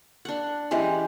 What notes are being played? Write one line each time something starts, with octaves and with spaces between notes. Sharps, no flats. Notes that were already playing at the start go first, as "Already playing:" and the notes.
D4 F#5
E3 G#3 C#4 G4